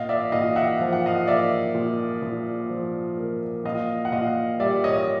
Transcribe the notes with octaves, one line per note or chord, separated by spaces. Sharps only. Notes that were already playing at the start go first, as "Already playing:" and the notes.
Already playing: A#2 D#5 F5
D5 E5
A#2 D#5 F5
E5 F#5
F3 F5
F#5
D#5 F5
A#3 D5 E5
A#2
A#2
F3
A#3
A#2 D#5 F5
F#5
A#2 D#5 F5
G3 D5 E5
C#5 D#5
D#5